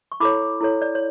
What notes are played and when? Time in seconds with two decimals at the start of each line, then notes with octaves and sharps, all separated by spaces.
0.12 C#6
0.20 E4 A4 C#5 B5 D6
0.61 E4 A4 C#5
0.82 D5
0.95 C#5